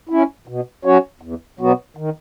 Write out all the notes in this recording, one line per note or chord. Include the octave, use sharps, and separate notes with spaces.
C#4 E4
B2
F#3 C#4 F#4 C#5
E2
B2 F#3 B3 F#4
D#3